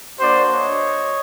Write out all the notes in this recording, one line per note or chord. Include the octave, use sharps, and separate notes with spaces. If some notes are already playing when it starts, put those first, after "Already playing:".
A#3 D4 F#4 C5 D5
C#5 D#5